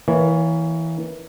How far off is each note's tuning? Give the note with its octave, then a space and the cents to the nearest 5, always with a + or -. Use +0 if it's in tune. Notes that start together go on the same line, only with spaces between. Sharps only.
E3 -10 A#3 +0 C#5 +20